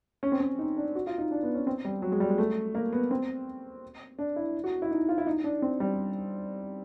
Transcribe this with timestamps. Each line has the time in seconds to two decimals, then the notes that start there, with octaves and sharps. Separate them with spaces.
0.23 C#4
0.32 C4
0.40 C#4
0.59 D#4
0.77 D4
0.95 F#4
1.07 F4
1.18 D#4
1.31 D4
1.43 B3
1.55 C#4
1.67 C4
1.85 G3
2.02 F#3
2.12 G#3
2.20 G3
2.30 G#3
2.38 A3
2.75 A#3
2.93 B3
3.11 C4
4.19 D4
4.36 E4
4.64 F#4
4.82 E4
4.91 D#4
5.09 F4
5.18 E4
5.27 D#4
5.44 D4
5.62 C4
5.80 G3